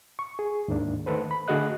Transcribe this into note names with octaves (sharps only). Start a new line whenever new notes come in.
C#6
G#4
D#2 G#2 A#3 D4
D#3 A3 A4 B4 C5
B5
D3 A3 F#4 G#4 D#5 F#6